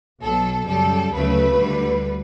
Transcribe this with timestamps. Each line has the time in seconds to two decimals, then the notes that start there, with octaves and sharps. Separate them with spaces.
0.21 B1 B2 F#3 A4
0.67 F#2 C#3 G3 A4
1.13 D2 C#3 F#3 A3 B4
1.59 D2 D3 G3